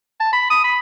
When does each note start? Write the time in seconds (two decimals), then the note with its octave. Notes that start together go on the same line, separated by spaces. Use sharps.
0.20 A5
0.33 B5
0.50 D#6
0.64 B5